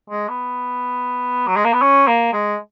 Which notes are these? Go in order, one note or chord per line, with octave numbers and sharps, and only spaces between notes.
G#3
B3
F#3
G#3
A#3
B3
C#4
A#3
G#3